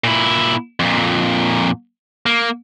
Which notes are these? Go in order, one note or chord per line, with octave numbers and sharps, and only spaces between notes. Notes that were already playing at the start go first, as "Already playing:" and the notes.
A#2 E4
F2 A#2
A#3